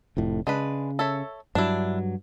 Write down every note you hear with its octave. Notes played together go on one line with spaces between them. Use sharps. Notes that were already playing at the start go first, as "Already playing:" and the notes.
F1 F2 A2
C#3 G#3 D4 B4
A4 C#5 E5
G2 F#3 D4 E4